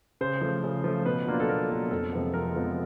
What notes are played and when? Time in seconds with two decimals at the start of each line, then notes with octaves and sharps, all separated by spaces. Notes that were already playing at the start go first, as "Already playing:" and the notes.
0.21 C#3 C5
0.41 F3 A3
0.64 C#3
0.84 F3 A3
1.06 B2 B4
1.27 F#3 A#3 D4 F4
1.40 A4
1.49 B2 A#4
1.70 F#3 A#3 D4 F4
1.91 F2 A4
2.13 C3 F3 G#3 B3
2.34 F2 A#4
2.56 C3 F3 G#3 B3